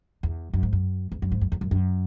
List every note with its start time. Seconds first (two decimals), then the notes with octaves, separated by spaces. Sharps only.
0.23 E2
0.53 F#2
0.63 G#2
0.73 F#2
1.12 E2
1.22 F#2
1.32 G#2
1.41 F#2
1.52 E2
1.61 F#2
1.71 F#2